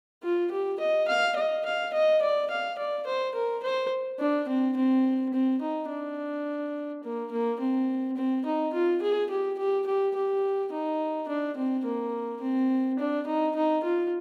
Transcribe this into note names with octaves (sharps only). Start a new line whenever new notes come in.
F4
G4
D#5
F5
D#5
F5
D#5
D5
F5
D5
C5
A#4
C5
D4
C4
C4
C4
D#4
D4
A#3
A#3
C4
C4
D#4
F4
G#4
G4
G4
G4
G4
D#4
D4
C4
A#3
C4
D4
D#4
D#4
F4